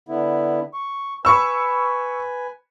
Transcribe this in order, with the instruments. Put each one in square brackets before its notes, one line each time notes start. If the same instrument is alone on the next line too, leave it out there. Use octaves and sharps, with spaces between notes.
[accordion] D3 B3 E4
C#6
[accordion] B4 G#5 [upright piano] B5 C#6 E6